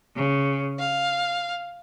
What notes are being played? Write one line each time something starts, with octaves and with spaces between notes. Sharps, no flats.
C#3
F5